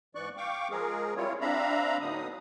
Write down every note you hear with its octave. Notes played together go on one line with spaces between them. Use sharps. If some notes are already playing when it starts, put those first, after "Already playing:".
G#2 E3 D5 C#6 F#6
F5 G5 C#6 D6
F3 G#3 G#4 A#4
G3 C4 E4 F4 C#5
C4 D4 E5 F5 A#5 B5
A2 D3 F#3 B3 D#4 D#6